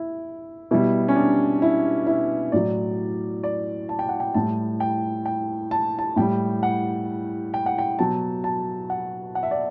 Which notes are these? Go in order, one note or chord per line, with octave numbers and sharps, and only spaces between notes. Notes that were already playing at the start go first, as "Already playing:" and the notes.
Already playing: E4
B2 G3 E4
C#4
D4
E4
E4
A2 F#3 D5
D5
A5
G5
F#5
G5
A2 G3 A5
G5
G5
A5
A5
A2 G3 G5
F#5
G5
F#5
G5
B2 F#3 A5
A5
F#5
F#5
E5
D5